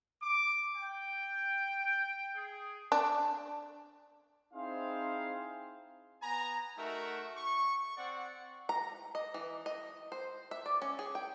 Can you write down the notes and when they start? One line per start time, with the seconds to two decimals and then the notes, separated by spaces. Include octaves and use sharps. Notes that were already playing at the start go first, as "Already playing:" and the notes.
0.21 D6
0.76 G5
2.35 G#4
2.92 D4
4.54 C4 D#4 E4 G#4 C5 F5
6.22 B3 G#5 A#5
6.77 A3 D#4 F#4 A#4 E5
7.36 C#6
7.97 C4 D5 F#5
8.69 A#5
9.15 D#5
9.34 E3
9.66 D#5
10.12 C5
10.51 E5
10.66 D5
10.82 C#4
10.99 G#4
11.15 G5